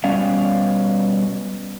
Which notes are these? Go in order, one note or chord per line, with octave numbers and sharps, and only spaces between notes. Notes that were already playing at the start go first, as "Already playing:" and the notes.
B2 G3 C#4 D5 F5